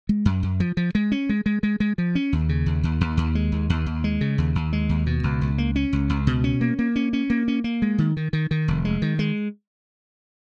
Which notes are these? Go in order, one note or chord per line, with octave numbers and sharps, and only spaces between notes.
G#3
F#2
F#2
F3
F3
G#3
C#4
G#3
G#3
G#3
G#3
F3
C#4
D#2
C#3
D#2
D#2
D#2
D#2
G#3
D#2
D#2
D#2
G#3
C#3
D#2
D#2
G#3
D#2
B2
C#2
C#2
A#3
C#4
C#2
C#2
B2
C#4
A#3
A#3
C#4
C#4
A#3
C#4
A#3
G#3
D#3
D#3
D#3
D#3
F1
G#3
D#3
G#3